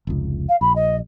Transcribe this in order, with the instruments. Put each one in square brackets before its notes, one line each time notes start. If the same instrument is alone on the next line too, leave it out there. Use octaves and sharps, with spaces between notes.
[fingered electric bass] F1 C#2
[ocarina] F5
[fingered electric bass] A#1 [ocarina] B5
[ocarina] D#5